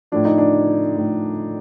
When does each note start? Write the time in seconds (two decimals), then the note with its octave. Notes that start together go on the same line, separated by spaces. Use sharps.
0.12 A2 F3 D4
0.25 D#4
0.38 D4
0.97 A2 F3